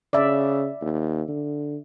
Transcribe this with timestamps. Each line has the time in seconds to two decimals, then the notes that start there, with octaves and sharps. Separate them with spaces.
0.13 C#3 D5 E5
0.82 D#2
1.29 D3